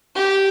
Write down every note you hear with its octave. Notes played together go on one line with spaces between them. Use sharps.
G4